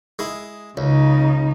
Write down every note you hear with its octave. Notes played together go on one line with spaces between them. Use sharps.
G#3 E4
C#2 C#3 D#4